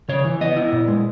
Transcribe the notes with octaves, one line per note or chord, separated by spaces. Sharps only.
C#3 C#5
E3
B3 D#5
E4
A#2
G#3